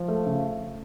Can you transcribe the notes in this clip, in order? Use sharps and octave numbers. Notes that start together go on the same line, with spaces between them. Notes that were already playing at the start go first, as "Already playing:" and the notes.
Already playing: F3
A3
C#3